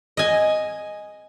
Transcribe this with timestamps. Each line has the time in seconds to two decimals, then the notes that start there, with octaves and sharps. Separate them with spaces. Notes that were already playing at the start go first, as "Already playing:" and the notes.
0.17 D#5 G#5